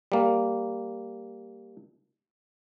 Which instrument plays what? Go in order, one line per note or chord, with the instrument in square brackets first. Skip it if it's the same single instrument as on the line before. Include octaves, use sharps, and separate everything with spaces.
[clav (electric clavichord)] G3 A#3